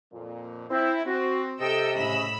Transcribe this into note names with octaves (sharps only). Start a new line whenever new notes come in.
F2 A#2
C4 E4
C4 F#4
C3 A4 D#5 G5 E6
A2 C#3 B5 E6